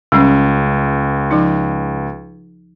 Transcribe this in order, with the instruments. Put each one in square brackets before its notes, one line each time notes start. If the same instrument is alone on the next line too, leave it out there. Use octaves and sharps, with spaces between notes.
[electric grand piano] C#2 [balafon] G3 C#4
[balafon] F3 D#4